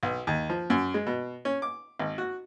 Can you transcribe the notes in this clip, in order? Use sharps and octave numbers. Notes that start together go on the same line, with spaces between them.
B1
D#2
F3
F#2
G#3
B2
C#4
D6
G#1
F#4